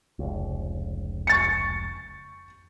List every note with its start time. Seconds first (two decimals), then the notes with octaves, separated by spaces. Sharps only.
0.19 F1 C#2
1.27 C#6 A6 C#7